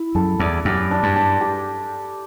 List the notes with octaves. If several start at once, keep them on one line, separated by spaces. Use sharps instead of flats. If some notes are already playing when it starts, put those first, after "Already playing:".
Already playing: E4
F#2 A4
E2 D5
F#2 G4
D4
G2
D4
G4